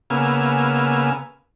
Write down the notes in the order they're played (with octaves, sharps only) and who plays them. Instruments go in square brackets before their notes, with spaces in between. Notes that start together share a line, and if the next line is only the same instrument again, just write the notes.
[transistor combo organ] C#3 A#3 B3 G#5 E6 F6